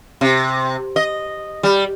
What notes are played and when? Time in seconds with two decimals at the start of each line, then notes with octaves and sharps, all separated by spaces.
0.21 C3
0.96 D#5
1.63 G3